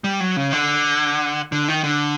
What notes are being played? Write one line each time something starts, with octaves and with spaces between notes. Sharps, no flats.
G3
F#3
C#3
D3
D3
D#3
D3